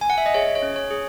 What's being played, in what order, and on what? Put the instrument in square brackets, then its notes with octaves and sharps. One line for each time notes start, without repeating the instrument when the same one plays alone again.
[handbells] G#5
F#5
E5
D#5
G#4 C#5
C#5
C#4
C#5
G#4